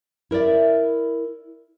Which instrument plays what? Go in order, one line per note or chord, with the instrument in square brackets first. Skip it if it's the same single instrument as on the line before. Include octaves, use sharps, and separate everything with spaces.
[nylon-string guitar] E4 A#4 C5 D5 E5